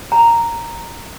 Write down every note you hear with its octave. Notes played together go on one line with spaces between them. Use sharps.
A#5